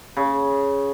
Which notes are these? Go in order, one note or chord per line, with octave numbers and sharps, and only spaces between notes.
C#3